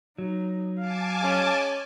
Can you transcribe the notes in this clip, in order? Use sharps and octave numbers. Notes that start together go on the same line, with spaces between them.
F#3 D#4
F5 G#5 A5 D6
G#3 C#4